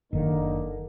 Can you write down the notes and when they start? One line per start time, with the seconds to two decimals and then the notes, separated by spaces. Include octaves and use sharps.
0.13 F#1 D3 D#3 A#3 D#4